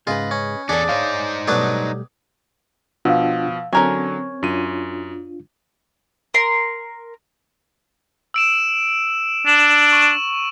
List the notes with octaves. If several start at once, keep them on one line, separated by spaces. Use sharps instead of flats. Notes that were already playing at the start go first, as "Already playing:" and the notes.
G#2 C#3 F4 G#4 B4 D#5
C#4
E2 C#4 D4 G#4 A4 D5
D#4 C5 C#5 F5
B2 F#3 G3 A3 D4 B4 D6 D#6
B2 F3 D4 F4 F5 F#5 E6
D3 F#3 C4 C#4 A#4 G#5 C#6 G#6
F#2 D4 F4 D#7
A#4 C6
E6 D7 E7
D4 E7 F#7
C#6 D#7 E7